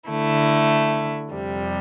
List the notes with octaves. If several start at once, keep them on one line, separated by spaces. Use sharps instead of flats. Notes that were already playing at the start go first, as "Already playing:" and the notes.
D3 A3 E4
F2 C3 G3